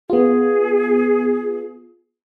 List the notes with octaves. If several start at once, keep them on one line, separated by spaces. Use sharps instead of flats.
B3 F4 G#4